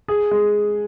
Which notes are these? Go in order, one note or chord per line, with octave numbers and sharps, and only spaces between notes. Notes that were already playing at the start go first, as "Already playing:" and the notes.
G#4
G#3